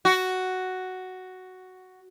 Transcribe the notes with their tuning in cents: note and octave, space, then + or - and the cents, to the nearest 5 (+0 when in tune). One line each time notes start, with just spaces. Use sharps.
F#4 +5